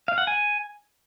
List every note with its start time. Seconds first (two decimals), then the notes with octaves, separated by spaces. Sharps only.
0.08 F5
0.18 F#5
0.27 G#5